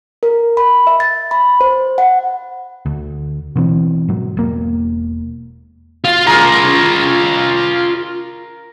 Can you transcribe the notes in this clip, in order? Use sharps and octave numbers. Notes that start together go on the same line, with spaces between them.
A#4
B5
E5
A6
B5
C5
F#5
D2
B2 E3 C4
G#2 F#3
E1 A#3
F4 F5
F4 G#4 A#4 A#5